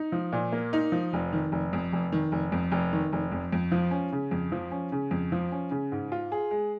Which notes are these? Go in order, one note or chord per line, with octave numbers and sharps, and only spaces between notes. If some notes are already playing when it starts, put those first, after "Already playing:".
Already playing: D#4
F3
A#2
A#3
D#4
F3
F1
D#3
F1
F2
F1
D#3
F1
F2
F1
D#3
F1
F2
F2
F3
C#4
C#3
F2
F3
C#4
C#3
F2
F3
C#4
C#3
G#2
F4
G#4
G#3